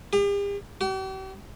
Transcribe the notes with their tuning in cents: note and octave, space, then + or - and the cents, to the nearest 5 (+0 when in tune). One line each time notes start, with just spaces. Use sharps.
G4 +45
G4 -45